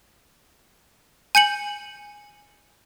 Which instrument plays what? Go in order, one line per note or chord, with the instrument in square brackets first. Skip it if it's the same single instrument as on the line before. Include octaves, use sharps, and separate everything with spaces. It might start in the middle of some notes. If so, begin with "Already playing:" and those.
[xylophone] G#5 G6 C#7 F#7